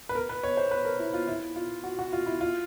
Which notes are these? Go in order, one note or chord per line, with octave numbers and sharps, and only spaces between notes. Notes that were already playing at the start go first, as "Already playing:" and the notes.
B4
A#4
B4
C#5
C5
B4
A#4
E4
F4
E4
F4
F#4
F#4
F4
E4
F4